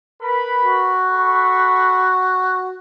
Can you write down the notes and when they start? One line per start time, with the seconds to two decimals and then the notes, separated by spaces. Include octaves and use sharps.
0.20 A#4 B4 B5
0.64 F#4
1.06 A4 B5 C#6